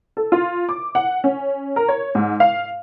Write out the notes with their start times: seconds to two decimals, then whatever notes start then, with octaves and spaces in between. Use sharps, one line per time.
0.17 A4
0.32 F4
0.69 D6
0.95 F#5
1.24 C#4
1.76 A#4
1.88 C#5
2.15 G#2
2.40 F5